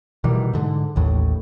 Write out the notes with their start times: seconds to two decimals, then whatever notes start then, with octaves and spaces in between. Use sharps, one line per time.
0.24 B2 D#3 E3 G3
0.53 G#2 D3
0.96 A1 D#2 A2